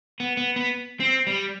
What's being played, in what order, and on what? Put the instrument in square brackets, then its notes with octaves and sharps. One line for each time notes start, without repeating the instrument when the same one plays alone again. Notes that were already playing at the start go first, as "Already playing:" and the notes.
[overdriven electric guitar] B3
B3
B3
C4
G3